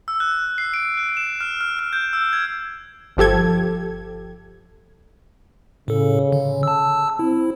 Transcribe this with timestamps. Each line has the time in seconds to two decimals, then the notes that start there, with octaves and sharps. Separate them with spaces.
0.08 E6
0.20 F#6
0.58 C7
0.74 D7
0.97 F#6
1.17 E7
1.41 F6
1.61 F6
1.79 F6
1.93 G6
2.13 E6
2.33 G#6
3.17 G1 F3 G4 A4 G#6
5.88 A2 C#3 A4
6.32 D3
6.63 A5 E6
7.19 C4 E4